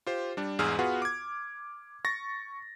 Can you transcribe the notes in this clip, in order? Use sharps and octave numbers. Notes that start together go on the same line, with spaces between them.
F4 G4 C5
G3 D4
E2 G#2 G#4 E6 F6
B3 F4 F#4 G#4 B4 F#5
D6 G#6
C#6 A6 A#6